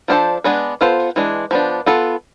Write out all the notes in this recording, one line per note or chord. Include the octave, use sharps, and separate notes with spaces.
F3 B3 D4 A4 C5
G#3 B3 D4 G#4 B4
B3 F4 A4 C5
E3 G#3 D4
F3 B3 D4
B3 F4 A4